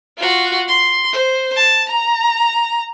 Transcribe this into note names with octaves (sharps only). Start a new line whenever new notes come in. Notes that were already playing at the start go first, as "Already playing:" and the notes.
F4 F#4
C6
C5
A5
A#5